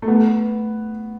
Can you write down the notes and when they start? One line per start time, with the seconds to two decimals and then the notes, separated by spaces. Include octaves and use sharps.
0.02 A3
0.08 B3